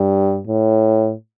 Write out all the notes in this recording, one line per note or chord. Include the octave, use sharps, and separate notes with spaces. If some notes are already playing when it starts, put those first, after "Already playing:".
Already playing: G2
A2